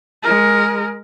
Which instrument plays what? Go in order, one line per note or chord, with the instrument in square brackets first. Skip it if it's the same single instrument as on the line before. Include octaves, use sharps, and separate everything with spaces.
[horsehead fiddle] G#3 A#4